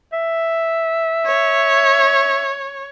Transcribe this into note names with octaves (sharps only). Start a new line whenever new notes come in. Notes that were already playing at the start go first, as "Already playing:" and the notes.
E5
C#5